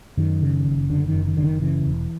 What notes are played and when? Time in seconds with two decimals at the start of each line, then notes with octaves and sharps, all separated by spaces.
0.17 F#2 D#3
0.42 C#3
0.66 F#1
0.90 F#2 D3
1.08 D#3
1.14 F#1
1.26 D#3
1.37 F#1 D3
1.44 D#3
1.61 C#3 E3
1.86 E1